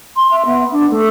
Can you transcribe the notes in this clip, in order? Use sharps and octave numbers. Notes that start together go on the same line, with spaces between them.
C6
E5
B3
D4
A3